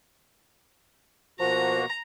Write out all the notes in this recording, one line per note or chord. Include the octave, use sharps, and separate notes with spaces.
B2 F3 A#3 F#4 A#5